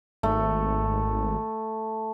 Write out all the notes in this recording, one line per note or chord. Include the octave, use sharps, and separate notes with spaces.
G#1 A3